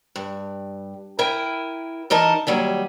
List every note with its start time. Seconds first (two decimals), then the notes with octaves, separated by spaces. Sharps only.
0.16 G2
1.19 E4 A#4 G5 G#5
2.10 E3 D#4 A#4 D#5 A5
2.47 D#2 F#3 G3 G#5